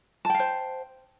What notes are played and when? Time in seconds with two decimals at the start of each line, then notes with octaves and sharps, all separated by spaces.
0.25 A5
0.30 G5
0.34 F5
0.39 C5